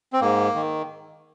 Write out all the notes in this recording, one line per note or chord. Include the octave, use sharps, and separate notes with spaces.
C4
G#2 A#3
D#3